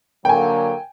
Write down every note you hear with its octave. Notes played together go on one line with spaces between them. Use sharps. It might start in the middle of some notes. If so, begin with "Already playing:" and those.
D3 F#3 A#3 G5 G#5